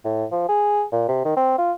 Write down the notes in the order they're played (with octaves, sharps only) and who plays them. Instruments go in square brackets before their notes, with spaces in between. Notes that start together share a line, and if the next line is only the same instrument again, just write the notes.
[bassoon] A2
F3
G#4
A#2
C3
D#3
C4
F4